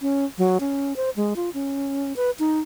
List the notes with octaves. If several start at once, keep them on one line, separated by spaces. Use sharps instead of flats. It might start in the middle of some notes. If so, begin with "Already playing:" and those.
C#4
F#3
C#4
C5
G#3
F4
C#4
B4
D#4